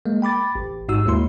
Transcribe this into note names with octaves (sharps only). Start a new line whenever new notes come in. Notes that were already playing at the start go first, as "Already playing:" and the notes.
G#3 A#3
G5 B5 D6 A6
A1
G#2 D#4 F#4 G4 E6
D#2 G#3 A#3 E4 C6